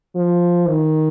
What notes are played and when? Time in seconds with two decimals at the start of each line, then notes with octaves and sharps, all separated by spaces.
0.15 F3
0.66 D#3